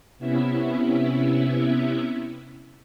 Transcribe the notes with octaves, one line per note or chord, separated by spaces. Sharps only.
C3 B3 C#4 E4 E5